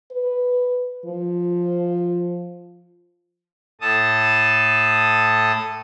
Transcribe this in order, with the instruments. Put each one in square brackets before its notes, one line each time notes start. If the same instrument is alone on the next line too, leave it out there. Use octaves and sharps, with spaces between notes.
[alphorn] B4
F3
[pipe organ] A2 A4 A5 D#6